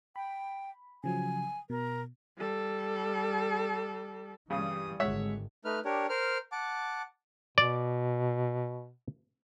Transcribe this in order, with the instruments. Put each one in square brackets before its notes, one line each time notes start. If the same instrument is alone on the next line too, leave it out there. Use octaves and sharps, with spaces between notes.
[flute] G5 [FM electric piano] B5
[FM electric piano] C#3 F3 F#3 [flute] G#5
[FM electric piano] B2 [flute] A#4
[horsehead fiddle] G3 A4
[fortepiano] G2 C#3 [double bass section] E3 G3 [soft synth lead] D#6
[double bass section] G#1 D3 [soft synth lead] G#3 [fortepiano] C#5 E5 F#5
[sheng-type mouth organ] A3 D#4 B4 F6
D4 G4 A#4 C#5
A#4 C5 F6
F#5 A5 D6
[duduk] B2 [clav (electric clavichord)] D5